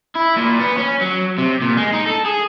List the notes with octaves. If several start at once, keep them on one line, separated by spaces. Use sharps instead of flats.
E4
A#2
B3
C#4
F#3
C3
A#2
G#3
D#4
A4
G#4